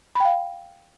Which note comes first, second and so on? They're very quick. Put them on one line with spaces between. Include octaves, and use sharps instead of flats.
B5 G5 F5